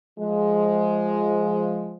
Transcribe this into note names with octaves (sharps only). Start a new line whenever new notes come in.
F3 G#3